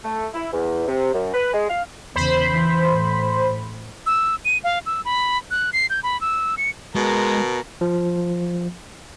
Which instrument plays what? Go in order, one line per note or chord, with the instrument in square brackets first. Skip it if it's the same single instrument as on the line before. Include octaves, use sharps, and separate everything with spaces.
[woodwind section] A3
E4
E2
C3
F#2
B4
G#3
F5
[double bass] E2 C#3 [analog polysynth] C5 B5
[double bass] E3
A2
[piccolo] E6
D#7
F5
E6
B5
F#6
C7
G6
B5
E6
C#7
[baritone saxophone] B2 [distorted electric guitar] G#3 [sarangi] A#4
[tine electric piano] F3